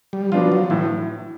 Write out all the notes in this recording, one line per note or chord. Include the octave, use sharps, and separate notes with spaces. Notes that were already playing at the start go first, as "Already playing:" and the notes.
G3
F3 F#3 B3 D4 F4
F#3
A2 E3